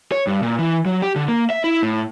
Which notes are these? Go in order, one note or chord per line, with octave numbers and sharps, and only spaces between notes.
C#5
G2
A#2
E3
F#3
G4
D3
A#3
E5
E4
A2